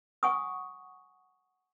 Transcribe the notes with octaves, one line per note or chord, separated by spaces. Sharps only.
F#5 G#5 C#6 D#6